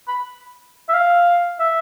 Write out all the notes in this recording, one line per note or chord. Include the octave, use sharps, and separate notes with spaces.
B5
E5
F5
E5